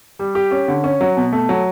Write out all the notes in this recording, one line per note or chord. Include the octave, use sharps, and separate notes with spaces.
G3
G4
C#4
D3
C#4
F#3
B2
A3
F#3